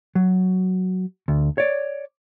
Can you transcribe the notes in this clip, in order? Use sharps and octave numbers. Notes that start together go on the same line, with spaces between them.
F#3
D2
C#5 D5